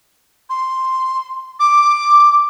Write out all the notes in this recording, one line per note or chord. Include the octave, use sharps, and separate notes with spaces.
C6
D6